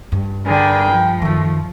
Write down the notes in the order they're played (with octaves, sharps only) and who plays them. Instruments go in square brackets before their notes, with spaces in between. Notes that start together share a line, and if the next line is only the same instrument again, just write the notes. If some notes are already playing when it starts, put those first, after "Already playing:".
[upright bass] G2
[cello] D3 G#4 [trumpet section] A#4 B4 G5
[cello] F3
[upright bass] F#2 D#3 [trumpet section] A3